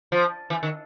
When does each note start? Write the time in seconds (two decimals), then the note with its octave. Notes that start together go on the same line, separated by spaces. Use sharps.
0.12 F3
0.50 E3
0.63 D#3